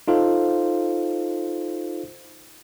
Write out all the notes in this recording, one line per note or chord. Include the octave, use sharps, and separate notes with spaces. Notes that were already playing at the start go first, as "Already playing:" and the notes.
D#4 F4 A4 C5 F5